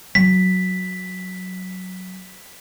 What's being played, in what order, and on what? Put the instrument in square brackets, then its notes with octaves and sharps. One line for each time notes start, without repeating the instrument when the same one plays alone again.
[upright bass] F#3 [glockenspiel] B6